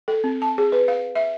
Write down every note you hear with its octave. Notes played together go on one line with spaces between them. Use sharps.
A4
C4
A5
G#4
B4
F5
E5